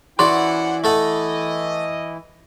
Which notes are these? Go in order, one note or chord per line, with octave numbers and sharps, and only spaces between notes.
E3 C#4 E4 F#4 C5 D5 F#5 C6
A3 A4 D#5 F#5